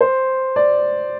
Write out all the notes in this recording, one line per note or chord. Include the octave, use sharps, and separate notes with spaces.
C5
D5